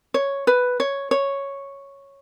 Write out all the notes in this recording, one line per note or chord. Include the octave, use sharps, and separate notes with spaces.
C#5
B4
C#5
C#5